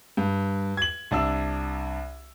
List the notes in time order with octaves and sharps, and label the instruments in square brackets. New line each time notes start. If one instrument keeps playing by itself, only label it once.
[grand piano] G2
G#6 F#7
C2 D4 E6